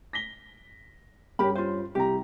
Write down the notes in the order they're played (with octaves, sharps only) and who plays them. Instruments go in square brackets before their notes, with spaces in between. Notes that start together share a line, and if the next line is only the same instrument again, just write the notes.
[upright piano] A#6 B6 G7
[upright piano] G2 C#4 [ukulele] G4 A#4 B5
[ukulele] F4 C5
[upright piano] C2 A#5 [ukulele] G4